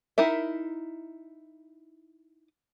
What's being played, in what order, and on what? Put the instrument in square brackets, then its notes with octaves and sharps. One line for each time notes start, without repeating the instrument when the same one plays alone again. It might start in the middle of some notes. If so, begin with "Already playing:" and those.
[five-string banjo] D#4 E4 A#4 E5